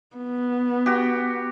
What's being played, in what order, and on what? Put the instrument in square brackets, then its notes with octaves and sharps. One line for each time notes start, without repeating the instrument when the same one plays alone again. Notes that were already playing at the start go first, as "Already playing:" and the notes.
[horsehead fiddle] B3
[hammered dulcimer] F#4 G4